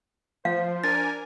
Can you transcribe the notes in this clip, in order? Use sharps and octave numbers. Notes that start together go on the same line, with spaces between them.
F3 C5 F5
D4 A#4 G#5 A6